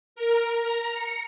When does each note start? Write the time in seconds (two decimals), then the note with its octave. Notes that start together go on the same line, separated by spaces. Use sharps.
0.16 A#4
0.63 A#5
0.94 C#7